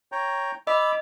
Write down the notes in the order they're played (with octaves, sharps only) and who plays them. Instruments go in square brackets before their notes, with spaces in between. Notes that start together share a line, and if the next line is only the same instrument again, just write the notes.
[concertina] C#5 G5 A#5
[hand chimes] D#5 [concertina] B5 D6 E6